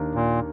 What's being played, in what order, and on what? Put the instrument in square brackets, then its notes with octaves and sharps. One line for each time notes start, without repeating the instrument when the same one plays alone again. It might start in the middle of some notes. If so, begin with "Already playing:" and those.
Already playing: [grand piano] D#2 D#3 A#3 D4
[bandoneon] A#2